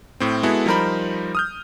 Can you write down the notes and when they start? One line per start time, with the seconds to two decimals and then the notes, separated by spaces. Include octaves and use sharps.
0.20 A2 C4
0.43 G#3 B3 E4 F#4 G#4 A4
0.66 F3 G3 D#4 A#4 C5 B5
1.35 D#6 F6 G6